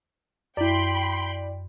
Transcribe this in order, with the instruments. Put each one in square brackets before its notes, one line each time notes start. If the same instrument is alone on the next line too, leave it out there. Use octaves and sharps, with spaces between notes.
[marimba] F#2 G6 [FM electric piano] E4 D5 [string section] G5 B5 C6